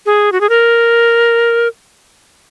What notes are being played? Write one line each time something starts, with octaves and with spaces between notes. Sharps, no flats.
G#4
F#4
G#4
A#4